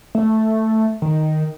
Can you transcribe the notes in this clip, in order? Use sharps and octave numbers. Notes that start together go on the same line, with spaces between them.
A3
D#3